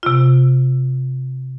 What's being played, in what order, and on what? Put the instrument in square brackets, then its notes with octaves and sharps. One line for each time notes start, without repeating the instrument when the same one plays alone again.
[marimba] C3 F4